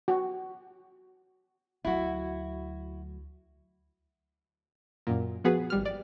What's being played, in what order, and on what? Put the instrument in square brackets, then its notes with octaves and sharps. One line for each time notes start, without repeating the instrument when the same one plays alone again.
[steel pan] F#4
[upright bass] D2 F#3 [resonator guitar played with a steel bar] E4 F#4
[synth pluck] F#2 A#2
F3 B3 F#4 G#4 B4
G#1 G3 F6
D5